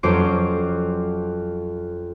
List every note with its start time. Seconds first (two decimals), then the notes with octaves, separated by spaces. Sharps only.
0.03 F2 F#3 C#4 C5 D6 D7